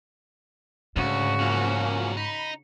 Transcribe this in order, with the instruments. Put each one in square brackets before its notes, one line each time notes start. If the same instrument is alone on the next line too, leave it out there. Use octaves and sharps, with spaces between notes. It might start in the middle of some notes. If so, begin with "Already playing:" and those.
[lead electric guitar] D2 [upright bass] G#2 [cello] C#3 F#4
[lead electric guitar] E2 F#3 [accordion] F3 A#3 C#4
[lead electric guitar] D#4 [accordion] B5